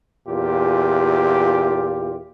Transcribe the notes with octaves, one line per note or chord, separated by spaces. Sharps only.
E2 A#2 F4 G4